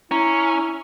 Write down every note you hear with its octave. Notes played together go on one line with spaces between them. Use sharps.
C#4 E4 A#5